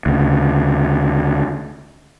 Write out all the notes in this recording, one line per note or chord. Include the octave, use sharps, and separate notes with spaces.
D2 C#3